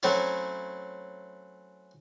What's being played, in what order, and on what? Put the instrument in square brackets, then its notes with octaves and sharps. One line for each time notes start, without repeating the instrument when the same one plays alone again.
[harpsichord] F#3 A3 C4 C#4 E4